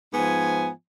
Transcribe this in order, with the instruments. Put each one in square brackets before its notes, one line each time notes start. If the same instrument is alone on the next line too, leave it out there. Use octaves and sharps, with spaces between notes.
[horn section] G#2 F3 B3 G#5